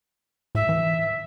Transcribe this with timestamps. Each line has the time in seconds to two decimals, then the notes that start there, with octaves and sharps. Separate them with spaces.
0.55 A2 E5
0.69 E3